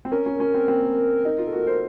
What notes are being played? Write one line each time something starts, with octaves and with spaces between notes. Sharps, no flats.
C4
C#4 A#4
C#4
C#4
C4
C4
D#4
F4
A4
F#4
C5